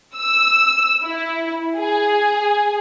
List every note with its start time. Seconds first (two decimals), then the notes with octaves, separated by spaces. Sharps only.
0.15 E6
1.03 E4
1.77 G#4